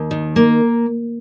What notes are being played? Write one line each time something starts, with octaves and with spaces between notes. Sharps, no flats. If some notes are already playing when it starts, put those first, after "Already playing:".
Already playing: D#2
D#3
A#3